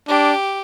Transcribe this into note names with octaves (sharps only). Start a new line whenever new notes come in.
D4 G4